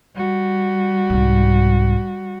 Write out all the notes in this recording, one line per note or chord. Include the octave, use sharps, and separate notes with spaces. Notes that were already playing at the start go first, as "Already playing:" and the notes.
G3 F#4
C2 G#2